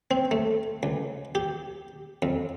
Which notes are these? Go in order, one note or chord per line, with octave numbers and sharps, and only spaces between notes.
C4
A3
C#2
G4
F2